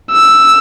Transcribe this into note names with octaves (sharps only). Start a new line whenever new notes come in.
E6